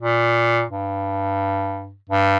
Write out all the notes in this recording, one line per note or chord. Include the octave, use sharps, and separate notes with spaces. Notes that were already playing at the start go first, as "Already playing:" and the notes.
A#2
G2
G2